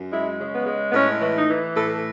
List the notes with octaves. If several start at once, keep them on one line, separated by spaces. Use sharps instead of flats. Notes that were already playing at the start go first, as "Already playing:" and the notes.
Already playing: F#2
G#3 E4
C#3
B3
G#3
B3
A2 C#4
E3
D#4
E3
A2 A4